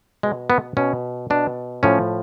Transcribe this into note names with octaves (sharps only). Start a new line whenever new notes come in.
B2 G#3
B3
B2 C#4
B2 D4
A2 F3 C#4